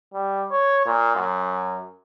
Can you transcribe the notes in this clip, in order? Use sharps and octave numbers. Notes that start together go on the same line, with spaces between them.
G3
C#5
A#2
F#2